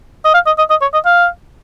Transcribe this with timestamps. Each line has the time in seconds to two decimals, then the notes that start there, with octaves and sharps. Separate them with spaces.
0.25 D#5
0.34 F5
0.46 D#5
0.58 D#5
0.70 D#5
0.82 C#5
0.94 D#5
1.05 F5